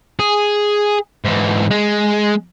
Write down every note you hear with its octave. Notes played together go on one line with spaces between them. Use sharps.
G#4
G#2 E3
G#3